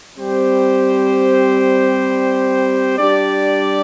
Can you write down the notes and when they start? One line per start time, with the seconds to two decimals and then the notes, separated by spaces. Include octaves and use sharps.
0.18 G3 C4 G4 C5
2.97 G3 D4 G4 D5